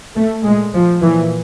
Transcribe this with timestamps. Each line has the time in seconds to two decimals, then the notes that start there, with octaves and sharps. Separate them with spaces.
0.15 A3
0.44 A#2 G#3
0.73 F3
1.02 A#2 E3